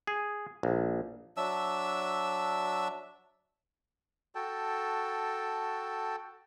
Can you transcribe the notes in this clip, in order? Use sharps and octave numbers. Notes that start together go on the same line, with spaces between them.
G#4
A#1
F#3 D4 E5 E6
F#4 A4 G5 A5